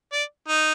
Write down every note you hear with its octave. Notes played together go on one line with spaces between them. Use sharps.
D5
D#4